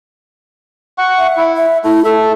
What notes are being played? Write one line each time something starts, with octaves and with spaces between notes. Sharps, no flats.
F#5 C#6
E5
E4
E5
A3 E4
A3 A4 E5